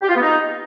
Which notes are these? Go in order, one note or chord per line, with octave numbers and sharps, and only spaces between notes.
G4
F4
B3
D#4